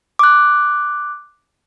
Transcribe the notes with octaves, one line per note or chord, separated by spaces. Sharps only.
D6 F#6